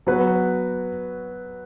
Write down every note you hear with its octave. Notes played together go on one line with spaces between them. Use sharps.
F#3 B3 F#4 B4